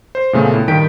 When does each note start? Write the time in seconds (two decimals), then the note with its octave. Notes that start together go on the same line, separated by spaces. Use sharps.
0.15 C5
0.33 A#2 C#3 A3 B3
0.54 A2
0.68 G2 D#3 G5 G6 B6 D7